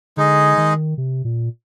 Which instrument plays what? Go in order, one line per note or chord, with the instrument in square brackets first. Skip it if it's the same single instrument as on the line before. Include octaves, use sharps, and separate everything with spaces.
[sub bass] D3 [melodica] G#3 D#4 G#4 D#5
[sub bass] D#3
C3
A#2